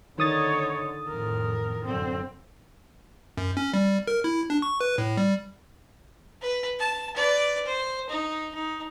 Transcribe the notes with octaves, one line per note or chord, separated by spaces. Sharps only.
D3 D#3 D#4 C#5 D#6 A6
F2 A2 A#4
F#2 D3 C4
F#2
C#4
G3
A#4
E4
D4
C#6
B4
A2
G3
B4
A5
B4 D5
C5
D#4
D#4